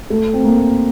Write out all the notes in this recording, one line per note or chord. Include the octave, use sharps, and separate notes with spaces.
A3
C4
A#3